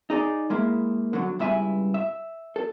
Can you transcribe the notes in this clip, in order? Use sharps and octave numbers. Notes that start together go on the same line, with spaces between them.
D#4 G#4 D5
G#3 A#3 E4
D3 F#3
C#2 G2 E4 E5 G#5
E5
A4